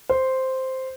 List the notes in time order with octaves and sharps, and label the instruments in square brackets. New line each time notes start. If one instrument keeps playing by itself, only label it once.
[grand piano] C5